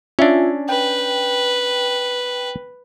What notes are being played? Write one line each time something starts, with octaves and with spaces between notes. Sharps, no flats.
C#4 D4 F4 E5 G#5
B4 G5